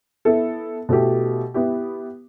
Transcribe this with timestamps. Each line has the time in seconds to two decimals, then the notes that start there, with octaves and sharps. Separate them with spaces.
0.25 B3 E4 A4
0.89 B2 A3 E4 G4
1.54 B3 E4 G4